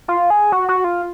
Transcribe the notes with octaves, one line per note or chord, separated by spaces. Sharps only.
F4
G#4
F#4
F#4
F4